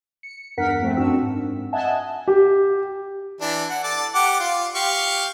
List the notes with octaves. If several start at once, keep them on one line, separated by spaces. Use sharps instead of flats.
C#7
E2 G2 A#4 F#5 B6
F3 A3 C4
F#2 C4 D4 F#4 E6
G#2
D#5 E5 F#5 G#5 A5
G4
E3 D4
F#5
A4 D5 A5
G4 F#5 D6
F4
G4 F5 C#6